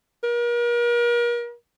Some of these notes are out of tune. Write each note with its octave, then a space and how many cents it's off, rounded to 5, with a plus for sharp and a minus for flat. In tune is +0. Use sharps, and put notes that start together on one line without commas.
A#4 +40